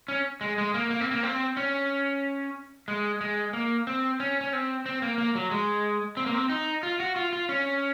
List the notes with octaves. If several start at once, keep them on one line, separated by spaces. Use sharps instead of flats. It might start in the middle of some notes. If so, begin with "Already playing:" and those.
C#4
G#3
G#3
A#3
A#3
C4
A#3
C4
C#4
G#3
G#3
A#3
C4
C#4
C#4
C4
C4
A#3
A#3
F#3
G#3
C4
A#3
C4
D#4
F4
F#4
F4
F4
C#4